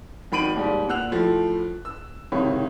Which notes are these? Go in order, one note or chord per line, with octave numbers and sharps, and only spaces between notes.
G#1 D#3 B5 D7 D#7 F#7
D#2 G#2 G3
A#2 F#5 E6 F#6 F7
A2 F3 A3
E6
F#1 G#2 C3 D#3 C#5 B5